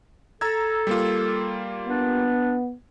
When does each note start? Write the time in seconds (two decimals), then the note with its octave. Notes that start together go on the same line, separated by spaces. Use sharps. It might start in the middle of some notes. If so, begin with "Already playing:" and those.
0.41 A4 A#5 E6 G#6
0.87 G3 A#3 F4
1.89 B3 D4